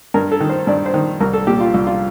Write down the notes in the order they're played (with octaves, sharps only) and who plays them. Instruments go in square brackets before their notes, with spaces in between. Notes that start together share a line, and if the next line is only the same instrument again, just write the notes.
[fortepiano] G2 A#4
A4
D#3
C5
G2 D5
C5
D#3
C2 A#4
A4
A#2 G4
F4
C2
F4